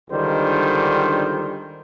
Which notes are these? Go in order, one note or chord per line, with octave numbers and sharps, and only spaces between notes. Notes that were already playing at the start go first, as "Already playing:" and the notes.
C#2 D3 D#3 G3 D4 C5